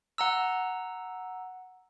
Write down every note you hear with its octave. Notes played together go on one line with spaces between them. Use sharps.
F#5 A#5 E6